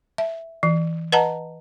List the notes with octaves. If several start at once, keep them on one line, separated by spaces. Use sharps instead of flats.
E5
E3
B4 D#5 F#5 A5 A#5